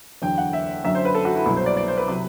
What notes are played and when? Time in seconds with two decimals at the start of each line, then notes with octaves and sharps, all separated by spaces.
0.22 E2 D3 F#3 G5
0.38 F#5
0.53 E5
0.84 F#2 D3 F#3 E5
0.95 C5
1.05 B4
1.15 A4
1.25 F#4
1.35 E4
1.46 C2 B2 F#3 E4
1.56 C5
1.66 D5
1.77 D5
1.88 C5
1.97 B4
2.07 C3 F#3